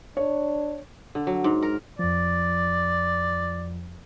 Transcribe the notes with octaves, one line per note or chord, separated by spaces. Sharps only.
D4 C#5
D3
F#3
G#2
A#4
F2 F3 D5